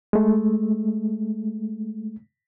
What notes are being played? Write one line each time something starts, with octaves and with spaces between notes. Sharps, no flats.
G#3 A3